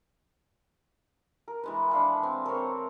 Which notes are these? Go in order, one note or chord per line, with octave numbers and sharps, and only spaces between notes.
A#4
E3 G#3 B4
D4 F5 B5
C4
C4 A4 A#4 C#5